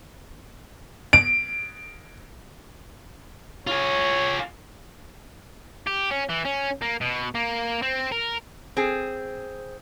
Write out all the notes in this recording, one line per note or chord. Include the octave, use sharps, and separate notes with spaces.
D7
F4 G#4 C#5
G4
C#4
E3
C#4
A#3
B2
A#3
C4
A#4
C4 G#4